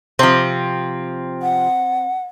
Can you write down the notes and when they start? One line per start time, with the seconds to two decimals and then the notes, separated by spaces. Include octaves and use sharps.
0.19 C3 F3 C4
1.42 F#5